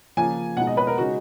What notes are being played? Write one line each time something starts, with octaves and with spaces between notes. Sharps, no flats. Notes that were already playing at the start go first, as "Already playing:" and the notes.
C#3 F3 A#3 G#5
B2 G#3 D#4 F#5
D#5
B4
A#4
C#3 G#3 D#4 F#4